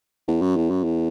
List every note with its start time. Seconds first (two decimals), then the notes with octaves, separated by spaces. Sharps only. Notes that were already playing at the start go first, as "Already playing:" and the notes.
0.28 E2
0.41 F#2
0.56 E2
0.70 F#2
0.84 E2